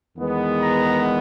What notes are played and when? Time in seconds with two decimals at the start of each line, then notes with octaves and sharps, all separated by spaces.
0.17 E2 D#3 G#3 B3
0.58 A#5